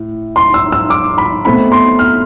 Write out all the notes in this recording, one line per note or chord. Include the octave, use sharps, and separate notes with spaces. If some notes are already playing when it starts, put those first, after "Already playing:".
Already playing: A2
C6
E6
E6
D6
B5
B2 A3 C4 B5
C6
F6